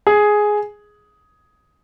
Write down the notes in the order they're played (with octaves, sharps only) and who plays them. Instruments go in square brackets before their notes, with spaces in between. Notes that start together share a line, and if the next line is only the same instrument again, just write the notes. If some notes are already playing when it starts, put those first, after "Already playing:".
[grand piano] G#4